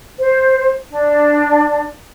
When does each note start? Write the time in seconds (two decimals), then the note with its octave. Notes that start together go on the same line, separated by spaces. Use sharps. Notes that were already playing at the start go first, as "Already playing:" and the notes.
0.18 C5
0.90 D4